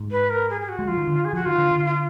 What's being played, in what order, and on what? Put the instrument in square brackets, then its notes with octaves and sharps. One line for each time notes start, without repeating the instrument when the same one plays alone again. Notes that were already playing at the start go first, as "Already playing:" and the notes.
Already playing: [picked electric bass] G#2
[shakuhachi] B4
A#4
G#4
G#4
F#4
[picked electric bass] G#3
[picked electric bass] F3 [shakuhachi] F4
[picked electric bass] D#3
D3
[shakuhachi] G#4
[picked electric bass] F3 [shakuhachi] F#4
[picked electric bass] D#3 [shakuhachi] F4
[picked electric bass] D3
D3
[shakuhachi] F4